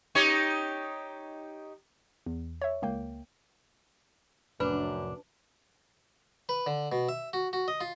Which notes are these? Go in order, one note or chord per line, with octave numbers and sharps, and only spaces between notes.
D#4 G4 C#5
E2
C#5 E5
C#2 A#3 G5
F1 F#2 A2 D4 B4 B5 D6
B4
D3
B2
E5
F#4
F#4
D#5
F4